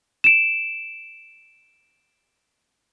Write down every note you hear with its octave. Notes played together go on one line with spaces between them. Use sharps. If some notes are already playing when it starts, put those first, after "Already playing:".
D7 E7